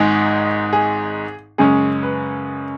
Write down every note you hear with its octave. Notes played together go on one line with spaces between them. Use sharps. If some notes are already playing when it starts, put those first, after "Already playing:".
Already playing: G#1 G#2 G#3 D#4 G#4
G#4
F#2 C#3 G#3 C#4 G#4
B4